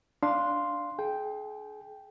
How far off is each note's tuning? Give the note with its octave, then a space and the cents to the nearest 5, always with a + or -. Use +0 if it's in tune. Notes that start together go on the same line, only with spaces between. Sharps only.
D4 +0 F5 +0 C6 +0
G#4 +35 G5 +0